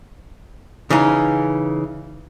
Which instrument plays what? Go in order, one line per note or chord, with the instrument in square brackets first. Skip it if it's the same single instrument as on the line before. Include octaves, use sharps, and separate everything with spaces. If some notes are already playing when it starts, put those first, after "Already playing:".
[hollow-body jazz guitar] C#3 E3 C#4 D#4